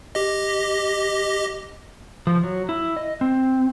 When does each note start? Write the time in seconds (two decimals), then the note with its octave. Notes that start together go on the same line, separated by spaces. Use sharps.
0.15 G4 D#5
2.27 F3
2.44 F#3
2.69 E4
2.97 D#5
3.21 C4